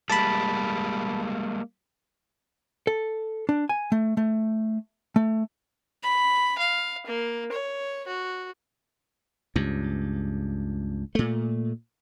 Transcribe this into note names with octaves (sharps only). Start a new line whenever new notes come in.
G3 G#3 A#3 A5 B5
A4
D4
G#5
A3
A3
A3
B5
F5
A#3
C#5
F#4
C#2 G2
A#2 A3